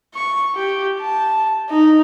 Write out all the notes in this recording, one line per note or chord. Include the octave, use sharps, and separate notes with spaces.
C#6
G4
A5
D#4